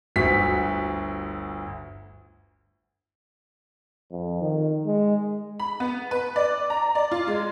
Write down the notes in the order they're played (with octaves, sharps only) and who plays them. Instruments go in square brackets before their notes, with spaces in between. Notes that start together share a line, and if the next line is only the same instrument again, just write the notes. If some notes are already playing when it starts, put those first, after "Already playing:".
[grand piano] G1 D2 F#4 B6
[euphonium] F2
D#3
G#3
[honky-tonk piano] B5
B3
B4
D5
A#5
D5
F4
G#3